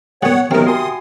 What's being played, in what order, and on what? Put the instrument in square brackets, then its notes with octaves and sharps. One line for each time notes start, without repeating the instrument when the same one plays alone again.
[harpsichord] G3 B3 [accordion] C#5 F#5
[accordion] D#3 F#3 A#4 [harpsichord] B3 C4 [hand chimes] G4 E5 G5
[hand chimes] F#4 G#5 [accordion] C6 D#6